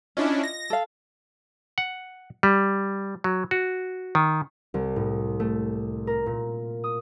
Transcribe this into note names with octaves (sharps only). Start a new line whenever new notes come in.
C#4 D4 E4 F4 D#5
A#6
A4 F5
F#5
G3
F#3
F#4
D#3
C2
A2
A3
A#4
A#2
D#6